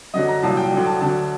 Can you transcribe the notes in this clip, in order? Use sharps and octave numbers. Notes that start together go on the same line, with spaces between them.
F#2 D3 F#3 D#5
A#5
C2 A#2 F#3 A5
G5
D2 D3 F#3 G5
A5
D2 D3 F#3 A5